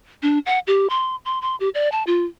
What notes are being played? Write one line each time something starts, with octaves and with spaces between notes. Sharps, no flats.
D4
F#5
G4
C6
C6
C6
G4
D5
A5
F4